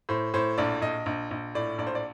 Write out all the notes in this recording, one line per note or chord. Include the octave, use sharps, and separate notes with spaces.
A2 C5
A2 C5
A#1 D5
A#1 D#5
A#1
A#1
A2 D5
A#1 D5
C5
D5